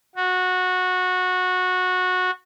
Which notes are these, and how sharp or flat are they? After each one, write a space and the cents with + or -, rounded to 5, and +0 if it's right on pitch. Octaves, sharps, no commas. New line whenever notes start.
F#4 -15